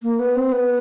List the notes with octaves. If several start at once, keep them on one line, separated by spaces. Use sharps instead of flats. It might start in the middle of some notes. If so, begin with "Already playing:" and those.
A#3
B3
C4
B3